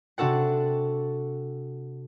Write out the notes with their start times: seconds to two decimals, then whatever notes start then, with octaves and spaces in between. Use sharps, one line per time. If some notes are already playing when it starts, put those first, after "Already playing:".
0.18 C3 D4 F#4 A4 F#5